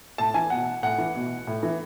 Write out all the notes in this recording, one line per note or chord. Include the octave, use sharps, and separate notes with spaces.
A2 A5
E3 G#5
B2 F#5
A2 F#5
E3
B2
A2
E3